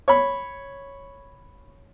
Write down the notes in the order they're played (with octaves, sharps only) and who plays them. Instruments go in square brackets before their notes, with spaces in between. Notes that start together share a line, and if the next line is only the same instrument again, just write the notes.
[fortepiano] C#5 B5